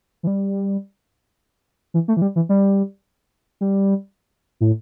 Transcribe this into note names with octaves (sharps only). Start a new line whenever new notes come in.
E3
G3
E3
A3
E3
G3
E3
G3
G3
A2